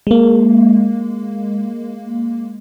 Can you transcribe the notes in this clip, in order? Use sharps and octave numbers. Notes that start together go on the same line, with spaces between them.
G#3 A#3